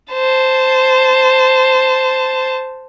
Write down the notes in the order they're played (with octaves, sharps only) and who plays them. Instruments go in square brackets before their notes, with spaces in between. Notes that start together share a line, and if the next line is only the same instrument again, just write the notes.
[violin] C5 A5